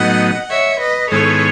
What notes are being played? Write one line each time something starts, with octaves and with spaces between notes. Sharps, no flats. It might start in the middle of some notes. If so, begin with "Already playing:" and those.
Already playing: A2 F#3 B3 D#4 D#5 F#5
C#5 E5
B4 D#5
G#2 D#3 G#3 B3 E4 A4 C#5